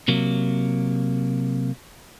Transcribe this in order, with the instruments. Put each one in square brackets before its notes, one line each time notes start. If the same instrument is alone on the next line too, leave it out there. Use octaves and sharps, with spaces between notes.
[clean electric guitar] C3 F#3 A#3